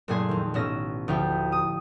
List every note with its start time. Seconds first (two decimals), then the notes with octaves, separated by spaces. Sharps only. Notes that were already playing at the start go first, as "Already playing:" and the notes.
0.08 F#1 A#2 A3 G#4 G#5 C6
0.29 F2 D#3
0.54 A1 B2 C#4 E6 A#6
1.08 D2 F3 E4 G5
1.52 D#6